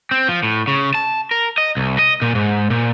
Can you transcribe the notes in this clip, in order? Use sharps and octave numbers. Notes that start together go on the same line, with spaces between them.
C4
F3
A2
C#3
A5
A#4
D#5
C2
D#5
A#2
G#2
A#2